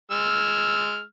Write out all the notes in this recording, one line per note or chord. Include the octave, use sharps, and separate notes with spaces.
G#3 E6 F6